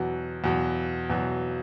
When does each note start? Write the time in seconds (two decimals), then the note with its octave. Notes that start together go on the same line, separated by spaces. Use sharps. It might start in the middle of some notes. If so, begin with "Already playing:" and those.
Already playing: E2 B2 F#3
0.44 E2 B2 F#3
1.10 E2 B2 F#3